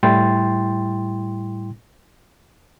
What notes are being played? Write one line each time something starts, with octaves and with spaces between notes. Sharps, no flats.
A2 G3 E4 G5 C6 A6